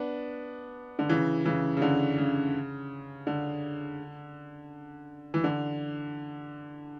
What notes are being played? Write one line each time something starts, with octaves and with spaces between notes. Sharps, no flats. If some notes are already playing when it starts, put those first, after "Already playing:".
Already playing: B3 D4
D3
C#3 E3
C#3 E3
C#3
D3
C#3
D3
E3
D3